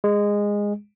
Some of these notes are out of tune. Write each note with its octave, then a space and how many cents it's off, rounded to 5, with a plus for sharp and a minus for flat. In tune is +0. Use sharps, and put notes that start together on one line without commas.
G#3 -15